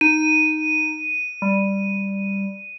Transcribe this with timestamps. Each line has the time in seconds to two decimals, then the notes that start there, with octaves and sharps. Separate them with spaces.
0.01 D#4 D#7
1.42 G3